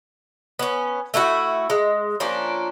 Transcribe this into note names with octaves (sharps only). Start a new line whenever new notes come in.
B3 C#4
A3 D4 E4 F#4
G#3
F3 A#3 C#4 D4